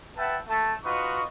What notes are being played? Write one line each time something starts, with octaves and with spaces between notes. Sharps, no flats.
B4 E5 F#5 G5 A5
A3 A5
D#4 F4 F#4 B4 D#5 C#6